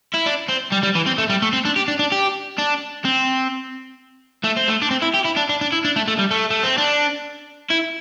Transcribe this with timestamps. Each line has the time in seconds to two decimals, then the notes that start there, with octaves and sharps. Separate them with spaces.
0.14 E4
0.26 D4
0.48 C4
0.72 G3
0.83 G3
0.95 E3
1.06 C4
1.18 A3
1.30 G3
1.42 A3
1.53 C4
1.65 D4
1.76 G4
1.88 D4
1.99 D4
2.12 G4
2.59 D4
3.05 C4
4.44 A3
4.56 C4
4.68 A3
4.82 D4
4.91 C4
5.02 E4
5.14 G4
5.25 E4
5.37 D4
5.49 D4
5.61 D4
5.72 E4
5.84 D4
5.96 A3
6.08 A3
6.19 G3
6.31 A3
6.50 A3
6.63 C4
6.78 D4
7.70 E4